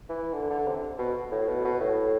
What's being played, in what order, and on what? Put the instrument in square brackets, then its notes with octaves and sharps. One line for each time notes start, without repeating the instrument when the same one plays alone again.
[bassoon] E3
D3
D3
C3
B2
A2
B2
B2
A2